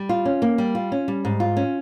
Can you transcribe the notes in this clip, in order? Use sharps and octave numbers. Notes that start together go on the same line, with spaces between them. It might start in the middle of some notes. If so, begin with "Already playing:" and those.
Already playing: G3
F4
C#4
A#3
G3
F4
C#4
G3
G#2
F4
C#4